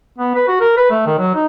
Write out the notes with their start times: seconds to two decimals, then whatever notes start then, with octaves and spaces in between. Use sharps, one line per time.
0.18 B3
0.35 B4
0.48 F#4
0.60 A#4
0.77 B4
0.91 A3
1.06 D#3
1.18 F#3
1.35 D#4